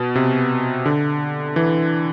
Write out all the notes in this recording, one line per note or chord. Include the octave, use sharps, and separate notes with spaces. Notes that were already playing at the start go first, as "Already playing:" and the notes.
Already playing: B2
C3
D3
E3